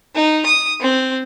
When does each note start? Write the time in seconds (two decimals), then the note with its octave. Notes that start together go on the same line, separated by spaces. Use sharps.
0.15 D#4
0.46 D#6
0.81 C4